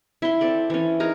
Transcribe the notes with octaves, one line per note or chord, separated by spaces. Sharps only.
E4 C6
C4 A4 D5
E3 C#4
D#4 G#4 A#4